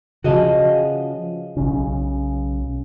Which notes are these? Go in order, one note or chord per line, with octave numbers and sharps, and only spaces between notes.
C#3 F3 F#4 G#4 D#5
B1 C#3